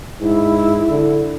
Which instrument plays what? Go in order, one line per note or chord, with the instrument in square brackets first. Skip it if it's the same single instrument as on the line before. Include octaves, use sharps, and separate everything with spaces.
[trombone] G#2 [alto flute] E4
[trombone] D3